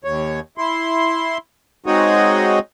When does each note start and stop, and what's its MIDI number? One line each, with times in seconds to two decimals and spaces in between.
0.04 0.40 39
0.04 0.40 73
0.58 1.38 64
0.58 1.38 84
1.86 2.59 56
1.86 2.59 60
1.86 2.59 63
1.86 2.59 66
1.86 2.59 73
1.86 2.59 75